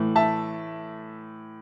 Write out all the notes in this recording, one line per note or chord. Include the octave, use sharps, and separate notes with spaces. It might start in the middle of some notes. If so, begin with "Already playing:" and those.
Already playing: A2 E3 A3
E5 A5